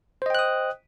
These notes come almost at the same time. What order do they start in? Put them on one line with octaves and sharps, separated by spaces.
C5 D#5 G5 F#6 D#6